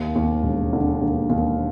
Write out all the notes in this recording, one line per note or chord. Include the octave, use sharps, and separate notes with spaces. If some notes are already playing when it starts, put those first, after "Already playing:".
Already playing: D#2
D#2
E1
D3
D#2
D#2